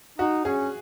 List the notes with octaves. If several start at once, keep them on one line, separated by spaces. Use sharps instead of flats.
D#4 F#4
C#4 G#4